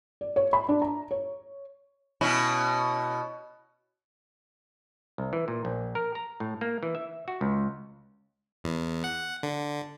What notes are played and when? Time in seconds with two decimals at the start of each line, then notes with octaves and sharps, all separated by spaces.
0.21 D5
0.36 C#5
0.53 B5
0.69 D4
0.82 A#5
1.11 C#5
2.21 B2 C#4 E4
5.18 C2
5.33 E3
5.48 A#2
5.65 A#1
5.95 A#4
6.15 A#5
6.40 A2
6.61 A#3
6.83 E3
6.95 E5
7.28 F#4
7.41 C#2
8.64 E2
9.04 F#5
9.43 D3